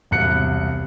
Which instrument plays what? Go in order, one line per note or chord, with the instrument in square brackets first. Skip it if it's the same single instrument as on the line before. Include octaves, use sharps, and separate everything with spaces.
[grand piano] E1 C2 F#6 C#7